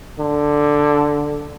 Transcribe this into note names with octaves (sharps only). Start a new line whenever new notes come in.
D3